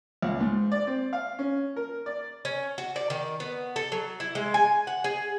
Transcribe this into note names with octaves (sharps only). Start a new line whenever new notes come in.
C#2
G#2
D5
C4
F5
C#4
A#4
D5
C#4
F#4
D5
D#3
B3
A4
F#3
E4
G#3
G#5
F#5
G#4